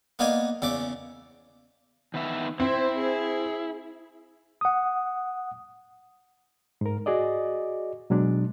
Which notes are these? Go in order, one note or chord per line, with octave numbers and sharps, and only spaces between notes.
A#3 B3 D#4 D5 F5 G#5
E2 C#3 D5 D6
D#3 B3 E5
C4 E4 C5
G#4
F#5 D#6
G#2 A#4
F#4 G#4 D5 D#5
B2 F#3 G#3 D4